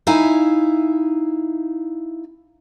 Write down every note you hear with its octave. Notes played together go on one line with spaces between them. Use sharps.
D#4 E4 E5 F5 G#5